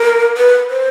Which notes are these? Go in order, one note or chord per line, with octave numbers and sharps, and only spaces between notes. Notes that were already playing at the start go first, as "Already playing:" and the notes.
Already playing: A#4
B4
C5